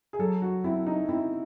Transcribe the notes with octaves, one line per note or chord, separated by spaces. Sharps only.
G#4
F#3 A4
F#4
C4 E4
D#4
C4 E4